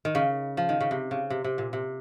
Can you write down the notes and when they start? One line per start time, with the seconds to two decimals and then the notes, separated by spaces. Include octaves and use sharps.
0.05 D#3
0.15 C#3
0.57 F3
0.69 D#3
0.80 C#3
0.91 C3
1.11 C#3
1.30 C3
1.44 C3
1.58 A#2
1.73 C3